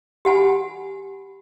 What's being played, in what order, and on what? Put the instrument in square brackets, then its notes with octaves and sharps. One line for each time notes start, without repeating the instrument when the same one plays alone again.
[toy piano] G4 F#5 G#5 B5